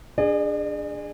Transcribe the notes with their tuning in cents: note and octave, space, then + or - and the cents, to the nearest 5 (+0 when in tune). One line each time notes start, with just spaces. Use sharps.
D4 +0 G#4 -10 D5 +45